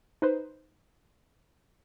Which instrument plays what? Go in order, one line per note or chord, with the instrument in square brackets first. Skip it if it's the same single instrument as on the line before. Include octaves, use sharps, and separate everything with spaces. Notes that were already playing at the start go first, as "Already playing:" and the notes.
[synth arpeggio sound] D#4 B4 C5